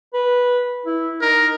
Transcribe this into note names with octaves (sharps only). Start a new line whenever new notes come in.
B4
E4
D#4 A#4